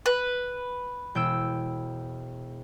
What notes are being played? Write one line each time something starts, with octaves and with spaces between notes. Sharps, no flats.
B4
E1 G5 E6